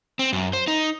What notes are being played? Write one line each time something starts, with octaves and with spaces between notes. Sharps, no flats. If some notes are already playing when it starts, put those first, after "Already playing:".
C4
F#2
C5
D#4